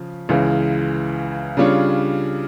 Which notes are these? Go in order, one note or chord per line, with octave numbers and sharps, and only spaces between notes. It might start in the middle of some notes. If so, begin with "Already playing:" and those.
Already playing: C#3 F3
C#2 C#3 E3
C#3 G3 D4 F4 C#5